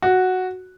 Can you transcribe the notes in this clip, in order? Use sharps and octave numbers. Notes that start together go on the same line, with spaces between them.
F#4